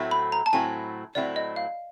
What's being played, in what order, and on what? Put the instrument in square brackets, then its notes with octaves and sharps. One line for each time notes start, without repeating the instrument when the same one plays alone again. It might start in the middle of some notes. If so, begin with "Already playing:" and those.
Already playing: [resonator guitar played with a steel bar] A2 F#3 A3 C4 E4
[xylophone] B5
A#5
A5
[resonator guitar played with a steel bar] A2 F#3 A3 C4 E4 [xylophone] G#5
[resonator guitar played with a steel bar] A2 F#3 A3 C4 E4 [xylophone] D5
[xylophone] D#5
F5